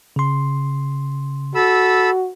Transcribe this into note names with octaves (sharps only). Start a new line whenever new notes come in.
C#3 C6
F#4 A4 B5 E6